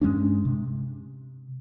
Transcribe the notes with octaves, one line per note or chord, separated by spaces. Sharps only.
G2 G#3 C#4 D4
C3